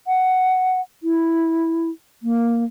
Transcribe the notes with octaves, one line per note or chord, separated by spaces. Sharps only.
F#5
E4
A#3